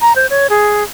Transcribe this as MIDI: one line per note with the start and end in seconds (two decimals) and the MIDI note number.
0.01 0.13 82
0.16 0.27 72
0.30 0.47 73
0.50 0.84 68